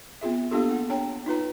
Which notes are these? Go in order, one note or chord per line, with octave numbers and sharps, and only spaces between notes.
B3 C4 F4 G#4 E5
A#3 B3 D4 F4 G4 A4
F#5
D4 C#5 G5 A#5
D#4 F4 B4 A#5